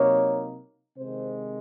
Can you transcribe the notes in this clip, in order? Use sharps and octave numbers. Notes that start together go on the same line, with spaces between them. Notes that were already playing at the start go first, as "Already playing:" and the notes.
Already playing: C3 F#3 A#3 D#4 C#5
C3 D#3 G#3 C5